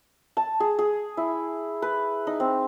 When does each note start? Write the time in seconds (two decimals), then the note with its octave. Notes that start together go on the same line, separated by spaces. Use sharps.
0.37 A5
0.60 G#4
0.79 G#4
1.17 E4
1.82 B4
2.27 D#4
2.40 C4